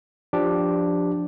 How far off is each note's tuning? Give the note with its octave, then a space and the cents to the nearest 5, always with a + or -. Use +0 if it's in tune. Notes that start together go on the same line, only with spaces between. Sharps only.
F3 +10 D4 +0 G4 +0